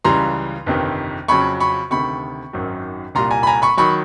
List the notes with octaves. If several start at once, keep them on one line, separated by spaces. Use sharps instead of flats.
C#2 C#3 E3 G3 A#5 C6
G1 F2 C3 D#3
F2 C#3 F#3 B5 C#6
B5 C#6
D2 C3 D#3 B5 C#6
G#1 F#2 D#3 F#3
C2 A#2 G3 A#5 C6
G#5 A#5
B5
G#5 A#5
B5 C#6
D#3 F#3 B5 C#6